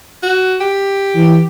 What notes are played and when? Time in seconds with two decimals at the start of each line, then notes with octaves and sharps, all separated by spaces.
0.23 F#4
0.61 G4
1.15 E3